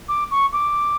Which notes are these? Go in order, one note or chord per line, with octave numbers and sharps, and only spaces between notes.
D6
C#6
D6